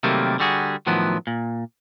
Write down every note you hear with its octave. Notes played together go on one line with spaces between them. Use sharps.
C3 D#3 F#3 G3 A3 A#3
D3 G3 F#4 G#4
A2 D#3 F3 F#3 B3
A#2